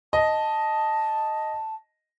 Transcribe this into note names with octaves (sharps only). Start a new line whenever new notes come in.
D#5 A5